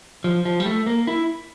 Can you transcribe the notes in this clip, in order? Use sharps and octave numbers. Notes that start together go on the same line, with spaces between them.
F3
F3
G3
A3
A#3
E4